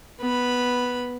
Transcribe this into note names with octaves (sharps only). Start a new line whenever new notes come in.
B3 B5